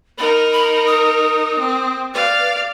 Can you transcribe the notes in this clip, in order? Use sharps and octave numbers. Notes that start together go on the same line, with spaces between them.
D#4 A#4 B5
B5
D#6
C4
B4 D5 F5